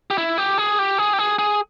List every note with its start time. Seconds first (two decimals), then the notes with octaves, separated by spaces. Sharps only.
0.10 G4
0.18 E4
0.38 G4
0.58 G#4
0.79 G4
0.98 G#4
1.13 G4
1.19 G#4
1.39 G#4